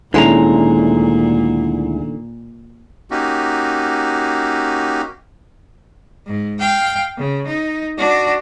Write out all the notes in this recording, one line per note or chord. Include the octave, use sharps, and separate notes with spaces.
D2 A#2 D3 D#3 G#3 C#4 E4 A#5
A#3 C#4 D#4 F#4 G4
G#2
F5 G5
C#3
D#4
D4 F#4